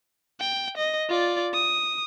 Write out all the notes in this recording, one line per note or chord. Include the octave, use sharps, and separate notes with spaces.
G5
D#5
F4 D5
D#6